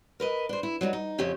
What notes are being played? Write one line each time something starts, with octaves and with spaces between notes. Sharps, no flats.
A#4 B4 D#5
D4 C5
E4
F#3 G3 D4 D#4
D#4
F2 C#3 C#4 G4 E5